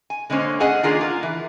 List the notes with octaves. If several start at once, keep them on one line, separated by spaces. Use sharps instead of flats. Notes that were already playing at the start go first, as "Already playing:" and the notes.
G#5
D3 G#3 A#3 C#4 C5
A3 C#4 G#4 D#5 F#5 G#5
D#3 A#3 D4 F4 G#4 A#4
F4 A#4
E3